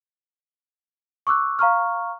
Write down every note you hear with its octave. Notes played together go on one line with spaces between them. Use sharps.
C#6 D6 E6 F#6
F5 A#5 C#6 F6